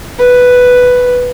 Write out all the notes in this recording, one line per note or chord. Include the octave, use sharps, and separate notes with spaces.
B4